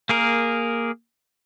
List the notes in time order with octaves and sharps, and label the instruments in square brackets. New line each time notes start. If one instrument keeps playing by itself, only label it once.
[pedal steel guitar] A#3 G#4 A#4